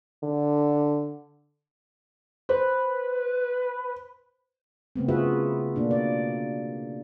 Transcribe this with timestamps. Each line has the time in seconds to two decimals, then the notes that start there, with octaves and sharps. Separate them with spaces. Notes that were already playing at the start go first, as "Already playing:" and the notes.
0.23 D3
2.49 B4 C5
4.96 C#3 A3 B3 C4
5.09 F4 F#4 G#4 B4 E5
5.76 B2 A#3 D4
5.91 D5